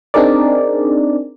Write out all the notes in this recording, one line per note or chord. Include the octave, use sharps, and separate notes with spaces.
C4 D4 D#4 G#4 A#4 D5